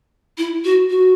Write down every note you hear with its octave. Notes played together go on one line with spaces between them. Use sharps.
E4
F#4
F#4